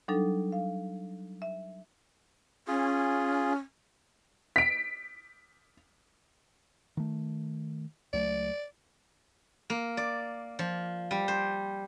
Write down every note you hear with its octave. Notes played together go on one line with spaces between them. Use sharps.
F#3 G3 D4 D#4 A4
F5
E5
C#4 F4 G#4
B6 D7
D#3 A3
C#2 F#3 A3 D5
A#3
D5
F3
G3
C5